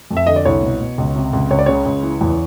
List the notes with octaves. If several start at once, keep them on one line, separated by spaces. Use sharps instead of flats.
F2
E5
D3 D#5
D5
C2 C#5
B2
B2
C#2
C3
C#2
C#2 C#5
D5
C#3 C#5
C#2
E3
E2